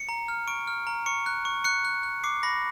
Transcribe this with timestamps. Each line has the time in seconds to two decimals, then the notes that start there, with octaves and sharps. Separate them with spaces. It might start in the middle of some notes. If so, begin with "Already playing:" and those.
Already playing: C#7
0.09 A#5
0.28 F6
0.47 C#6 D7
0.67 F6
0.87 A#5
1.06 C#6 C#7
1.26 F#6
1.45 C#6
1.64 F#6 C#7
1.85 F#6
2.03 F#6
2.24 D6 C7
2.43 B5 A#6